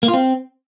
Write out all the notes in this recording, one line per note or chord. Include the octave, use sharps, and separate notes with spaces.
A#3
F4
C4